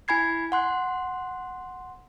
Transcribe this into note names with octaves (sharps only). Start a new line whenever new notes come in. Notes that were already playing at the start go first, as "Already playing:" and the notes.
E4 G#5 B5 G#6 C7
F#5 C6 F#6